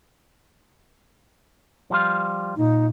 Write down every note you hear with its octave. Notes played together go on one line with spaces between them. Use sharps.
F3 G3 F4
A#2 D#4